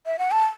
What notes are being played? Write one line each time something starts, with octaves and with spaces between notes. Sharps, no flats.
E5
F#5
A5